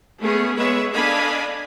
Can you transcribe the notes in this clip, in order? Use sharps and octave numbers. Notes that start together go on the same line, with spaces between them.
A3 B3 C#4 G#4
G#3 B3 G#4 B4 C#5 E5
D4 A4 D#5 F5 G#5 B5